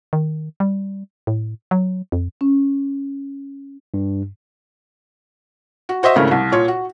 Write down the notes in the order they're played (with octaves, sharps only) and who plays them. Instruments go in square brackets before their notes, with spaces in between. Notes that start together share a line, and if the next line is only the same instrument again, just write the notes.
[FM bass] D#3
G3
A2
F#3
F2
[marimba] C#4
[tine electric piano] G2
[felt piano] F#4
F#4 C5 D#5 E5
G#1 C#3 A3 E4 A#4
C2
A#2 F4 C#5
F#4